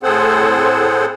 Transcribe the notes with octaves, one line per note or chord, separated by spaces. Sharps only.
A2 C4 G#4 A4 C5 F#5